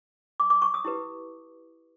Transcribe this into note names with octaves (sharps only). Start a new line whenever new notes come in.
D6
D6
C#6
D#6
E4 G4 B4